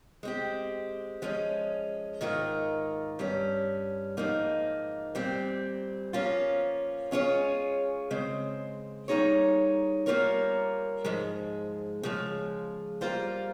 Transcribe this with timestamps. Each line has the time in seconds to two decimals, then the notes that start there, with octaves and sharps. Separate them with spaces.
0.23 G#3 C4 G4
1.22 F3 G#3 C#4
2.21 G#2 D#3 A#3 F4 A#4
3.19 G2 G3 C#4
4.17 G#2 F3 A#3 D#4
5.15 A#2 G3 C4
6.13 F3 A#3 C#4 F4
7.11 G#3 C#4 F4 G#4 C#5
8.10 C#3 G#3 C4
9.08 G3 A#3 D#4 G#4 C#5
10.06 G3 A#3 F4 A#4 C#5
11.04 G#2 F3 G#3
12.03 C#3 F3 G#3
13.01 G3 A#3 F4 C5